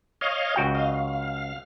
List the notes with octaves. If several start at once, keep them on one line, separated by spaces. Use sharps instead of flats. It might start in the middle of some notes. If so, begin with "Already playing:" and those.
C#5 D#5 F5
C#2 F#4 G5
D#5 F5
F5